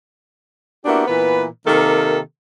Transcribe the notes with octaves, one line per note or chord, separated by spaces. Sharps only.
A#3 B3 D4 E4 F#4 G4
A#2 E3 B3 B4
C3 D#3 A#3 G4 A4 A#4